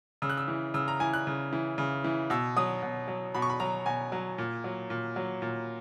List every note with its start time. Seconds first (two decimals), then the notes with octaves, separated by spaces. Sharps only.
0.22 C#3 E6
0.30 F#6
0.37 E6
0.48 E3
0.74 C#3 E6
0.88 A#5
1.00 E3 G#5
1.13 F#6
1.27 C#3
1.53 E3
1.78 C#3
2.04 E3
2.30 B2 E6
2.56 F#3 D#6
2.83 B2
3.08 F#3
3.34 B2 B5
3.42 C#6
3.50 B5
3.60 F#3 A#5
3.86 B2 G#5
4.12 F#3
4.38 A#2
4.64 F#3
4.90 A#2
5.16 F#3
5.42 A#2